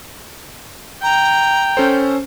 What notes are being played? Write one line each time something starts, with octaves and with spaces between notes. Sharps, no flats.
G5 A#5
C#4 A4 C5